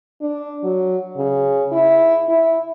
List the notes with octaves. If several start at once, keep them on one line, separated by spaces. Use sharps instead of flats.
D4
F#3
C#3
E4
E4